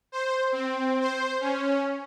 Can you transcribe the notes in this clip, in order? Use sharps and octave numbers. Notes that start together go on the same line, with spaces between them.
C5
C4
C5
C#4